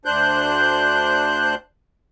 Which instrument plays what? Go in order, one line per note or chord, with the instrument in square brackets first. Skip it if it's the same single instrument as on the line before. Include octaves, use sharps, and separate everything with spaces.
[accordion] D2 D4 C5 F#6 G6